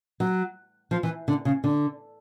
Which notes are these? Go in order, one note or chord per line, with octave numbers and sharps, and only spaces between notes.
F#3
F3
E3
D3
C#3
D3